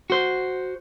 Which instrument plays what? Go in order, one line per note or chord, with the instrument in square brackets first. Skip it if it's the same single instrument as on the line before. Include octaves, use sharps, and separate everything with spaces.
[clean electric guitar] F#4 C5